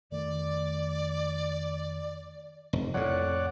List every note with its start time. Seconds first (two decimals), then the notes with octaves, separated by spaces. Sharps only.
0.11 F2 D#3 A3 D5
2.73 F1
2.94 F2 A2 C#5 D5 F#5